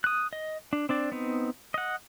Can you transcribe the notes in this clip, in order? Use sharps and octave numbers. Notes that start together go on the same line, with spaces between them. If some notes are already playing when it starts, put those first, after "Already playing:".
D#6 F#6
D#5
D4
C4 D4 D5
B3 C4 D#4
D#5 F#5